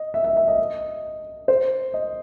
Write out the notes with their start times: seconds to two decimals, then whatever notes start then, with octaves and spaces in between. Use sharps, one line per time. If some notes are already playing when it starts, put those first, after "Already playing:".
Already playing: D#5
0.14 E5
0.24 E5
0.37 E5
0.48 D#5
1.48 C5
1.94 D#5